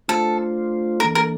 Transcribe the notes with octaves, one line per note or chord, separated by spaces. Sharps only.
A3 D4 F4 A4 C5
E3 A#3 D4 A4 A#4
A#4